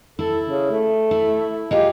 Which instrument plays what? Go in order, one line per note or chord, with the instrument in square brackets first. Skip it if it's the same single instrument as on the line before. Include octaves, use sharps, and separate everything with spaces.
[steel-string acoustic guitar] E4 [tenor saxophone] A4
[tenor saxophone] C#3
A3
[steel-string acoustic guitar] E4
[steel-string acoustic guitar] G#3 D#4 F4 [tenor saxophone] G4